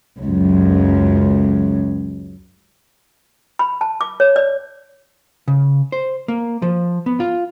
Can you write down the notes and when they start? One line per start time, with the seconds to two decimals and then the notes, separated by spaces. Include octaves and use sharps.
0.21 C#2 F#2
3.59 B5
3.81 A5
4.01 D6
4.20 C#5
4.36 D5
5.48 C#3
5.92 C5
6.28 A#3
6.62 F3
7.06 B3
7.20 F4